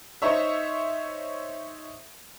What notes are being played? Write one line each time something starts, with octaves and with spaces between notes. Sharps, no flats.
D#4 C5 C#5 E5